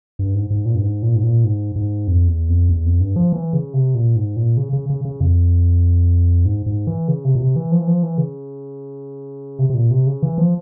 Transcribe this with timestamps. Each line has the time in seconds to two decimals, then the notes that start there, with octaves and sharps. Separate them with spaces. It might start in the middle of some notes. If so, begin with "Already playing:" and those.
0.19 G2
0.35 G#2
0.50 G#2
0.66 A#2
0.75 G2
0.82 G#2
1.03 A#2
1.16 G#2
1.23 A#2
1.45 G#2
1.76 G#2
2.08 F2
2.28 E2
2.49 F2
2.69 E2
2.85 F2
3.00 G2
3.16 F3
3.33 E3
3.53 C#3
3.74 C3
3.95 A#2
4.16 G#2
4.36 A#2
4.57 C#3
4.73 C#3
4.90 C#3
5.05 C#3
5.21 F2
6.45 G#2
6.66 G#2
6.87 E3
7.08 C#3
7.24 C3
7.35 A#2
7.40 C3
7.56 E3
7.72 F3
7.79 E3
7.87 F3
8.03 E3
8.18 C#3
9.59 C3
9.70 C3
9.74 A#2
9.91 C3
10.07 C#3
10.22 E3
10.38 F3